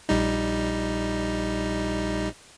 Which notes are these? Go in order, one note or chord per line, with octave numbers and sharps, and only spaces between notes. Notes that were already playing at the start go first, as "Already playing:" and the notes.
A#1 G3 D#4